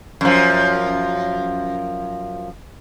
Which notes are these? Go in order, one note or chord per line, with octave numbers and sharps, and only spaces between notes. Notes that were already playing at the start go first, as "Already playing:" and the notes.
F#2 F3